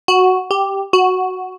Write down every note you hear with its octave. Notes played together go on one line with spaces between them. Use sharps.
F#4
G4
F#4